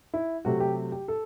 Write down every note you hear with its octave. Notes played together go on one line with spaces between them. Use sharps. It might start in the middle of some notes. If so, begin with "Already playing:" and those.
E4
C3 F#3 A3 F#4
G4
G4
A4